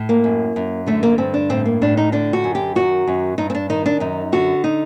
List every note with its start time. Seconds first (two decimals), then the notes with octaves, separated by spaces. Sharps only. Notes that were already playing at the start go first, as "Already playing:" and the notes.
Already playing: A2
0.09 A#3
0.24 F#2
0.56 F#2
0.87 D3 A3
1.03 A#3
1.18 G2 C4
1.34 D4
1.49 A2 C4
1.65 A#3
1.81 A2 D4
1.97 D#4
2.12 D3 D4
2.33 F#4
2.44 F#2
2.55 G4
2.75 D#3 F#4
3.07 F#2
3.38 G2 D#4
3.50 C4
3.55 D4
3.70 D#3 D#4
3.86 D4
4.00 F#2 D#4
4.32 D3 F#4
4.64 D#4